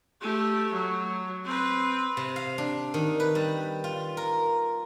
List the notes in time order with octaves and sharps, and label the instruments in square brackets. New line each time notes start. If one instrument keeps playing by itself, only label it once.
[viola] A3 G4
F#3
C4 B4
[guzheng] C3
F5
D4
D#3
B4
G3
F4
A#4